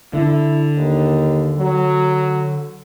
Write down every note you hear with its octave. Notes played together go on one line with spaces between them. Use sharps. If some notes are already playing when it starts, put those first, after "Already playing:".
D3 E4
D#2
F#3